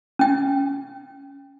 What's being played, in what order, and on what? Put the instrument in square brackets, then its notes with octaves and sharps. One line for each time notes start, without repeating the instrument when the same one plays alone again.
[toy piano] C#4 G5